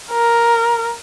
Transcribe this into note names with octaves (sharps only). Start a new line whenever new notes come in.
A#4